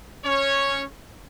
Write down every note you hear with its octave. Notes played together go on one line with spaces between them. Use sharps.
C#4 C#5